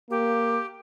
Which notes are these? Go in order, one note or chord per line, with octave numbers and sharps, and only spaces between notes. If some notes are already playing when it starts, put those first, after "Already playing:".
A#3 G4